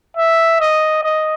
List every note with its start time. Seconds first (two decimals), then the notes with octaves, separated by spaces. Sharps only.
0.17 E5
0.60 D#5
1.03 D#5